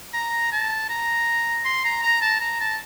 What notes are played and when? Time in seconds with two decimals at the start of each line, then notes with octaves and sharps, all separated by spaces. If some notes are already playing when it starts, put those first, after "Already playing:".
0.14 A#5
0.52 A5
0.89 A#5
1.65 C6
1.85 A#5
2.03 A#5
2.22 A5
2.41 A#5
2.61 A5